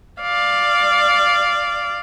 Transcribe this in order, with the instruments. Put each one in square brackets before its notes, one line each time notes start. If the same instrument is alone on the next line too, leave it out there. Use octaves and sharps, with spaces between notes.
[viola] D5 F5